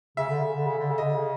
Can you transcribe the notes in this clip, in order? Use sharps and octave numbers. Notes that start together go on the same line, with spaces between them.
C#3 E5
D3
C#3
D3
C#3
D3
C#3
D#5
D3
C#3